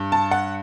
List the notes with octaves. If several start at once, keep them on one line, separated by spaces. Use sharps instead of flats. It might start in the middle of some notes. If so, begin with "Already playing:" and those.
Already playing: G2
A5
F#5